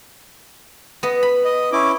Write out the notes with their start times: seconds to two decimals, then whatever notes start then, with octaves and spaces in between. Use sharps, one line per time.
1.03 B3 D#5
1.23 B5
1.45 D#5
1.72 C#4 E4 D6